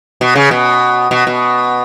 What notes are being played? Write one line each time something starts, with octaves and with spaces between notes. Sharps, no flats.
B2
C#3
B2
B2
B2